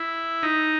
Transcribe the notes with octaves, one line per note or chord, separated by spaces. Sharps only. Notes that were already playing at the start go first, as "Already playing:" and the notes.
Already playing: E4
D#4